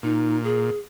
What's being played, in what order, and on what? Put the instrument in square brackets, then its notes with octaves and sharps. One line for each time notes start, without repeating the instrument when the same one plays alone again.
[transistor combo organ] A#2 [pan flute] D#4
[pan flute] G#4